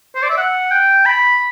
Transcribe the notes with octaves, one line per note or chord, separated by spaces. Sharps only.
C5
D5
E5
F#5
G5
B5